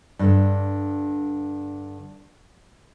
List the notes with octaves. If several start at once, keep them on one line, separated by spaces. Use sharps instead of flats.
G2 D3